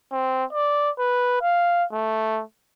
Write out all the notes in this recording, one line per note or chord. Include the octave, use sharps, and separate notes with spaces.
C4
D5
B4
F5
A3